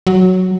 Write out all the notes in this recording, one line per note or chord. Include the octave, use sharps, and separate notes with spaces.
F#3